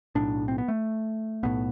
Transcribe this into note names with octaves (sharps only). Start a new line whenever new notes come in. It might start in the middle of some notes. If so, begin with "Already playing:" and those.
B1 A2 D4
C4
B3
A3
B1 A2 B3